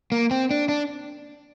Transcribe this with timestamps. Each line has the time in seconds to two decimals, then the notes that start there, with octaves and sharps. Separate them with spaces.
0.12 A#3
0.31 C4
0.51 D4
0.69 D4